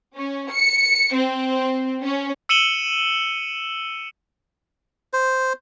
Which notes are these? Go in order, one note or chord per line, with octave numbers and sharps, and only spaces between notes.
C#4
C#7
C4
C#4
E6 C#7 D#7 E7 F#7 G7
C5